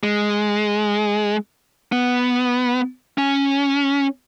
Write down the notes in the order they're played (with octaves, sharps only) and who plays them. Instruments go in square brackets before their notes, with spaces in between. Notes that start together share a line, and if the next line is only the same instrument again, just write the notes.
[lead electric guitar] G#3
B3
C#4